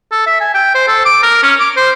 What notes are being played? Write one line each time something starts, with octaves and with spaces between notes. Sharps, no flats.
A4
E5
G#5
G5
C5
A4
D6
A#4
C#4
D6
C5